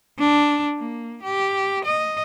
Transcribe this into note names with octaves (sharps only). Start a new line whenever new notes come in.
D4
A#3
G4
D#5